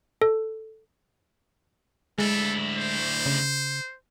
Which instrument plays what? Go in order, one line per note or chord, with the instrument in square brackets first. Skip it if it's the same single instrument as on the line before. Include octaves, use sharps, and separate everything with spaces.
[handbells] A4
[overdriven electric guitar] D2 E4 [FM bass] G#3 [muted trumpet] A4
[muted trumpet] C5
[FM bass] C#3